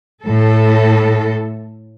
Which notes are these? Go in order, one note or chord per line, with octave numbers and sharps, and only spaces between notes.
A2 A4